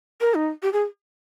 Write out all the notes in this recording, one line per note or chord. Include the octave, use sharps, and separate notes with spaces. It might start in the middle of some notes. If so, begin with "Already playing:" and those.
A#4
D#4
G4
G#4